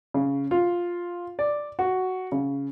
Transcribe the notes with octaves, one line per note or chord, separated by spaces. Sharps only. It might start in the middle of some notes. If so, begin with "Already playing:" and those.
C#3
F4
D5
F#4
C#3